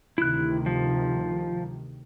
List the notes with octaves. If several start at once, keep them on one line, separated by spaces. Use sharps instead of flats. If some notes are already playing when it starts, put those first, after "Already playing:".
D2 C3 D#3 E4 F#6
F3